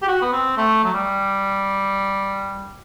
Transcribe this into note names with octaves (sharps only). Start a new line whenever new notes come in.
G4
F#4
B3
C4
A3
F#3
G3